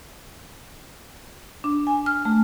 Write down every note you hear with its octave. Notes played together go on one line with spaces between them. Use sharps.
D4
G#5
F6
A3